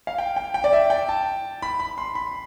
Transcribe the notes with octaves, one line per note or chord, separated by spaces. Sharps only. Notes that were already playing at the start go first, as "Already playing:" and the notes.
F5
G5
G5
G5
D5
E5
G5
A5
B5
B5
C6
B5